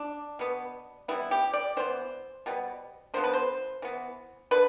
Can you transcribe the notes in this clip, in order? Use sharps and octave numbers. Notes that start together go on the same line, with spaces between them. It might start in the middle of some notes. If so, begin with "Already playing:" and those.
Already playing: D4
B2 B3
E3 G3 B3 E4
G4
D5
E3 B3 C5
B2 G3 B3
D3 F3 B3 C5
B4
C5
E3 B3
D3 B4